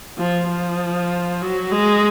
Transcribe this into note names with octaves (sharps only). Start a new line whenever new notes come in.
F3
F3
F#3
G#3